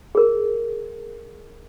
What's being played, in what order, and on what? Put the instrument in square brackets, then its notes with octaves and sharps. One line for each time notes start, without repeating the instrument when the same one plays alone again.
[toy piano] G#4 A#4